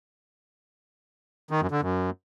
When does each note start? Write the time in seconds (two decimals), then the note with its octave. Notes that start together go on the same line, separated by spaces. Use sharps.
1.51 D#3
1.61 F#2
1.71 D3
1.81 F#2